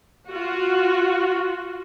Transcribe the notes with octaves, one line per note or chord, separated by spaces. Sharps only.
F4 F#4